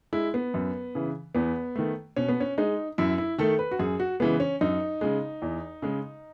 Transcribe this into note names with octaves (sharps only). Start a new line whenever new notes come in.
G#3 E4
B3
F#2
C#3 E3
E2 B3
D#3 A3
B2 C#4
B3
C#4
G#3 D#4
F#2 E4
E4
D#3 A3 A4
B4
F#4
F#2 G#4
F#4
C#3 E3 G#3 B3
C#4
F#2 D#4
C#3 G#3
E2
C#3 G#3